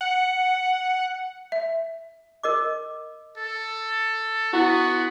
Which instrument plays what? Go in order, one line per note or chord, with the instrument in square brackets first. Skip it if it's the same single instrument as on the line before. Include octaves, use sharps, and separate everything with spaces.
[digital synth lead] F#5
[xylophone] E5
[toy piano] A#4 D#5 D6
[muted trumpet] A4
[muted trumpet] B3 [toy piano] E4 [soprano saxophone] F#4